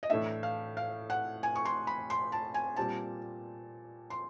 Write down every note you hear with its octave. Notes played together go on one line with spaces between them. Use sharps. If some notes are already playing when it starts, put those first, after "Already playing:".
D#5
A2 E3 A3 D4 E5
F5
F5
F#5
G#5
C#6
C6
B5
C6
A5
G#5
A#2 G3 C4 A5
C6